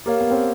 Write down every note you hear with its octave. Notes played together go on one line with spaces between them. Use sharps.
A#3 G4 A#4 C#5 F5
B3
C4